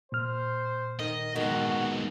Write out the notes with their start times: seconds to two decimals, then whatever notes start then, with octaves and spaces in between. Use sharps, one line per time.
0.12 A#2 C5 F6
0.99 D#3 D#5
1.36 G#2 B2 D#3 F#4